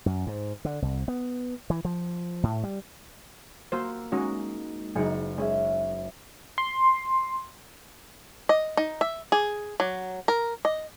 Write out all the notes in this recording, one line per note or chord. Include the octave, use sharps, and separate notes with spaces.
F#2
G#2
D3
C2
B3
E3
F3
A2
G3
A#3 F#4 C5 E6
G#3 C#4 D#4 F#4
F#1 G#3 D#4 F#5 C#7
G#3 C#4 E5
C6
D#5
D#4
E5
G#4
F#3
A#4
D#5